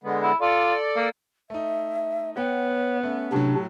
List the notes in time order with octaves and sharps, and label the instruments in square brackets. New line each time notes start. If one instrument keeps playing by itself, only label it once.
[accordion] D3 G#3 B3
[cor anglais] E4
[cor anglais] F4 [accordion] A4 D5
[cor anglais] A#3
[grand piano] A3 D#4 [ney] E5
[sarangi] B3 [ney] C#5 [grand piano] F#5 G5
[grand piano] A3 [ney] C#4
[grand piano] A2 F#3 [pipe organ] C3 D4